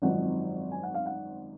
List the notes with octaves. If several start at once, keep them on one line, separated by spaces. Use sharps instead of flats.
G#1 F#2 F3 C4 D#4 F#5
G#5
F#5
F5
F#5